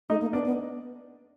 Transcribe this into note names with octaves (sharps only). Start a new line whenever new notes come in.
A3 D#4 D#5
A#3
B3 D4 D5
B3